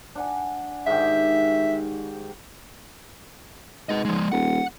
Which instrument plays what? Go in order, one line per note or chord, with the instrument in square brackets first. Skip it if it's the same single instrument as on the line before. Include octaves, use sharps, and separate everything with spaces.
[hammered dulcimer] D4 F#5 G#5
[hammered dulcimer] G#2 D#3 G4 [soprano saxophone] E5
[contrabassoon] G#2 [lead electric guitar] B4 D#5
[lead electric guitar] F3 G#3
[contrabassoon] D#1 [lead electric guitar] F#5